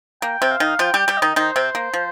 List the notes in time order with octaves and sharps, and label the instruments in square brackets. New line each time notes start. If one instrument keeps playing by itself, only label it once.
[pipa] A#3 [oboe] G5
[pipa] C3 C4
[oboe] F5
[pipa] D#3 D#4
[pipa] F3 F4 [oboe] G5
[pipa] G3 G4 [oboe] G5
[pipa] G3 G4
[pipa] D#3 D#4 [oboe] D#5
[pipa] D#3 D#4 [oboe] C5
[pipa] C3 C4
A#3
F3